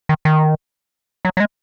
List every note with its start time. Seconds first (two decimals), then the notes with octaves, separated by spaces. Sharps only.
0.09 D#3
0.25 D#3
1.25 F#3
1.37 F#3
1.40 G#3